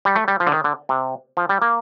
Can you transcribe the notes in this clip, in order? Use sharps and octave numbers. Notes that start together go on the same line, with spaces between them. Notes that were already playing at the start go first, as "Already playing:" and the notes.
G3
A3
G3
F3
D3
D#3
D3
C3
F3
G3
A#3